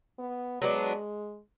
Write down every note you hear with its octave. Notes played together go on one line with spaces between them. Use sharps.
B3
F#3 G#3 B3 D4